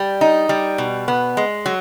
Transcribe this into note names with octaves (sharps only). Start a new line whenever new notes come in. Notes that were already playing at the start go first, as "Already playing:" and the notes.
Already playing: G3
D#4
G3
B2
B3
G#3
F#3